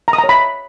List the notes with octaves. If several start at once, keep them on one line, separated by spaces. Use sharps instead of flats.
A#5
D#6
A#5
C#5
B5